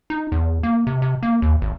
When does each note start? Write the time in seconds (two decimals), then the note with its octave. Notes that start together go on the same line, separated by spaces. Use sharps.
0.10 D#4
0.32 E2
0.63 A#3
0.87 C3
1.02 C3
1.23 A#3
1.42 D#2
1.62 G#1